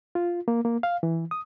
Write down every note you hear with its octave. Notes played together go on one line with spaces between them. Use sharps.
F4
A#3
A#3
F5
E3
D#6